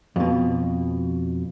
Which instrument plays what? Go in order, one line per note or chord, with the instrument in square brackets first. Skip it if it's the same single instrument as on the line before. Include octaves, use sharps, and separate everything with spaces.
[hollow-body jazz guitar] F2 B2